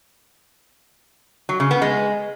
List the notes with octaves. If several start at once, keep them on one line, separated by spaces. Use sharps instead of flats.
F#3
C#3
B3
G#3